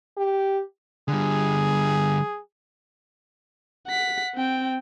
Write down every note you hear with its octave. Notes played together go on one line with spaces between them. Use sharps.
G4
D3 G3 G#4
F#5 B6
C4 G5